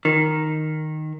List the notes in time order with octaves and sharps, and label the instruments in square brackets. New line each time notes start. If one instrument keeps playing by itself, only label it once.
[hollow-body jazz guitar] D#3